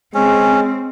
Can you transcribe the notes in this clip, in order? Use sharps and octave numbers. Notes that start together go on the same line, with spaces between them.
G#3 C4 C#4